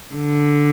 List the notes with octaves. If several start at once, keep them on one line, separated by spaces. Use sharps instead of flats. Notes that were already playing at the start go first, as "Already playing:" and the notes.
D3